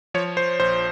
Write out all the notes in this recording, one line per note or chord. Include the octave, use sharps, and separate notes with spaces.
F3 C#5
C5
A#1 C5